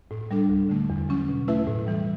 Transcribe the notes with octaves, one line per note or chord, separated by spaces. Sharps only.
A2
G3 D4 A4
D2
D3 A3
E2
C#3 F#3 C#4
B2
A3 E4 B4 E5
A2
E3 G3